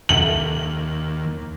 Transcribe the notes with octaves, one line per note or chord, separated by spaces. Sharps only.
D#2 F#7